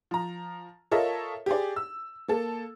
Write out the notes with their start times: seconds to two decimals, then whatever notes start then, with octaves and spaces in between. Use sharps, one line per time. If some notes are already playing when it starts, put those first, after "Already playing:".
0.11 F3 A#5
0.91 F4 A4 A#4 C#5 D#5 E5
1.46 G4 G#4 D5
1.76 E6
2.28 A#3 A4